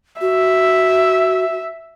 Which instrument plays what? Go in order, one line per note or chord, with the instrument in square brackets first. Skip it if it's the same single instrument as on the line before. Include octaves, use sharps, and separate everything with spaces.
[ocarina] F#4 [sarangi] E5